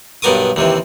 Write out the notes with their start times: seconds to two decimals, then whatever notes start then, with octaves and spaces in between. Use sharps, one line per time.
0.22 B1 G2 B3 A#4 D6 D#6
0.56 D#2 C3 E3